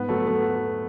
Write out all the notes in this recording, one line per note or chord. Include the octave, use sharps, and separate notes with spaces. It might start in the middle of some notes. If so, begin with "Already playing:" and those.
Already playing: G#2 B3
F#3 A3
F#3 B3